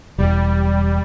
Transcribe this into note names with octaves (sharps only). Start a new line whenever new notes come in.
E1 G3